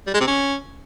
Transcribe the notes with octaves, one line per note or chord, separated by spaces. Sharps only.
G3
G#3
C3
C#4